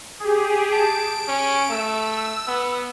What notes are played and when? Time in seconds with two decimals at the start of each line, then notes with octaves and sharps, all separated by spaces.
0.20 G4 G#4
0.72 A5 D7
1.28 C#4
1.70 A3 E6
2.47 B3